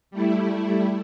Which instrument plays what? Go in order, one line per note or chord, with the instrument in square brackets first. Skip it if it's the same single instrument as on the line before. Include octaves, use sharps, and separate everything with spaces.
[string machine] G3 A3 E4